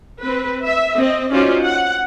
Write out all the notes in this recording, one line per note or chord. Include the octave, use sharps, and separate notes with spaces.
C4 B4
E5
C4 D#5
C#4 D#4 F4 F#4 C5 D5
F#5